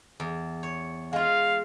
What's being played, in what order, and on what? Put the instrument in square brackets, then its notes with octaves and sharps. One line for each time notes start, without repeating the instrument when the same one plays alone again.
[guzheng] E2
C#5
[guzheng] G#3 F4 [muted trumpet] F5